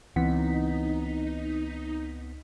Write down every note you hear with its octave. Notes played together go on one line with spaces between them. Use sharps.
C#2 E3 B3 C4 D#4 F#5 B6